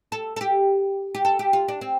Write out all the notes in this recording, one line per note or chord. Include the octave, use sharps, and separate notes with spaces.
A4
A4
G4
G4
A4
G4
F4
D4
C4